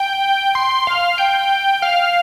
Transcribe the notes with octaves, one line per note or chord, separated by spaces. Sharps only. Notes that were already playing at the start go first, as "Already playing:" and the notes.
Already playing: G5
C6
F5
G5
F5